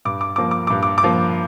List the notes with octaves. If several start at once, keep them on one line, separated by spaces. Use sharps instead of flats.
G2 D6
D6
F3 A#3 D6
D6
D6
G2
D6
D6
F3 A#3